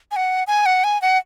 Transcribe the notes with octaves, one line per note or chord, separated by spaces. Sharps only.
G#5
F#5
G#5
F#5
G#5
F#5